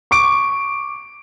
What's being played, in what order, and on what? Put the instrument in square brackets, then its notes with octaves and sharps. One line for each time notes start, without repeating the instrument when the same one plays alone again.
[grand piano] C#6 D6 D7